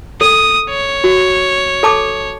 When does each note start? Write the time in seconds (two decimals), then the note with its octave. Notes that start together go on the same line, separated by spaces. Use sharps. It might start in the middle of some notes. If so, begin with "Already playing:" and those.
0.21 A4 D#6
0.69 C#5
1.04 F#4
1.83 A4 A5 D6